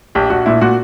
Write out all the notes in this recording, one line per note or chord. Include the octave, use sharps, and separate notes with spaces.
A#1 G4
A#1 F#4
A#2 E4
A#2 F#4